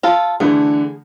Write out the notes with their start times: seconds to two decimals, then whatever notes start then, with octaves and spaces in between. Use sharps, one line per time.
0.03 F4 A4
0.40 D3 E3 A3 G#4